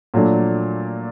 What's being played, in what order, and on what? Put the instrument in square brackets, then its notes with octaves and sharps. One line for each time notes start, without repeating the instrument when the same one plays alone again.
[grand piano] A#2 F#3 A3 D4